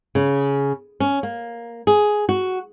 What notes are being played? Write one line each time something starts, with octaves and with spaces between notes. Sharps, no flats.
C#3
C#4
A#3
G#4
F#4